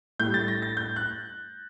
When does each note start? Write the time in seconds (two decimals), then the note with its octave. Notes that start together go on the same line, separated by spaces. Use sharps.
0.19 A2 G3 G6
0.34 A6
0.48 A#6
0.62 A6
0.77 G6
0.96 F#6